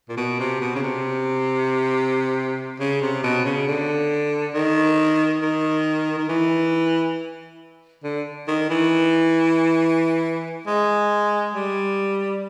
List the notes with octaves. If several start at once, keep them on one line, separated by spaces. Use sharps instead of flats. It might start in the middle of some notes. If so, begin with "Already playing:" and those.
A#2
B2
C3
B2
C#3
C3
C#3
C3
B2
C#3
D3
D#3
D#3
D#3
E3
D3
D#3
E3
G#3
G3